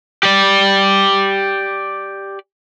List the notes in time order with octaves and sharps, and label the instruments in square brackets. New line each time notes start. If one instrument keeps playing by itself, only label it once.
[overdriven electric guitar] G4 D5